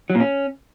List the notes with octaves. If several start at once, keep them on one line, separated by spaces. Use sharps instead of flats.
F#3
A#2
C#4